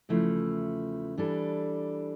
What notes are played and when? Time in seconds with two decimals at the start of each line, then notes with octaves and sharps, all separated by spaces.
0.09 E2 C#3 F3 A3 E4
1.17 E3 G3 D4 A4